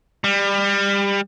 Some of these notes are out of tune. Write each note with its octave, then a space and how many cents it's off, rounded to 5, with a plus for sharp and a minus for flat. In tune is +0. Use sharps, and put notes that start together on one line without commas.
G3 +25